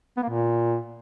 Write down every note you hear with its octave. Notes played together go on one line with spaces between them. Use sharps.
B3
A#3
A#2